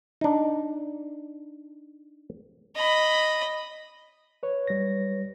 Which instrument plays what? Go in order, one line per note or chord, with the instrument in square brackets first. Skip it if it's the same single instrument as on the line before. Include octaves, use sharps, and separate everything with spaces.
[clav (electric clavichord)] D4 D#4
[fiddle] D#5 B5
[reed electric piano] B4 C#5
[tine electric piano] G3 A#6